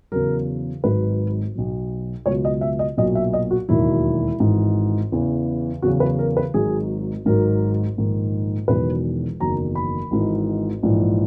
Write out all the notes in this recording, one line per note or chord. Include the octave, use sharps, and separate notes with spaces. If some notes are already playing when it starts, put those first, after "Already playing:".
E2 C#3 F#3 A#4
G#1 G#2 F#3 B4
B1 B2 F#3
C#2 B2 F#3 C#5
D#5
E5
D#5
B1 A#2 F#3 D#5
E5
D#5
F#4
E1 D#2 D#3 F#3 E4
G#1 G#2 E3
E2 C#3 E3
E2 C#3 F#3 F#4
B4
A#4
B4
G#1 G#2 F#3 G#4
G#1 G#2 D#3 F#3 A#4
A#1 G#2 D#3
E1 E2 D#3 F#3 B4
F#1 E2 D#3 F#3 A#5
B5
G#1 G#2 E3
A#1 G#2 E3